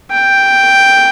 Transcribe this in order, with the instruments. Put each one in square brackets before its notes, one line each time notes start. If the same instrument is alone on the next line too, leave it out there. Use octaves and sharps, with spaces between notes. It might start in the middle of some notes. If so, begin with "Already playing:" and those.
[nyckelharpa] G5